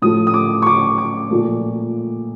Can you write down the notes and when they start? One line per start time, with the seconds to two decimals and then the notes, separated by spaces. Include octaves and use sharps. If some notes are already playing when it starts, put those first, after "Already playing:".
0.02 A2 F3 A3 D#6
0.27 D#6
0.34 D6
0.62 C#6
0.67 D6
0.98 D6
1.30 A#2 F3 A3